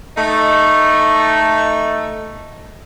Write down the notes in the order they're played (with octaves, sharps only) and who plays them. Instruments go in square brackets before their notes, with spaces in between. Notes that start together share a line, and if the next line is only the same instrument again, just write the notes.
[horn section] A3 D#4